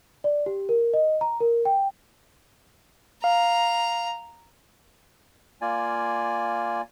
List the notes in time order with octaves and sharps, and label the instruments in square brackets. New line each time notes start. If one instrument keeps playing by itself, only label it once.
[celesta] D5
G4
A#4
D#5
A#5
A#4
G5
[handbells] F5 [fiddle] A#5
[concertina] A#3 F4 D5 G#5